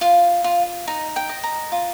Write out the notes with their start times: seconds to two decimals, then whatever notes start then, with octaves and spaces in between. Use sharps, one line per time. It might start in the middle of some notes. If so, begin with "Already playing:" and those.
0.01 F4 F5
0.44 F4
0.88 D#4 D#5
1.16 G5
1.29 D#5
1.43 A#5
1.72 F4